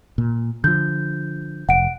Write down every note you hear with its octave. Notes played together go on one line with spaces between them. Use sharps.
A#2
D3 F3 G6
F1 F#5 D7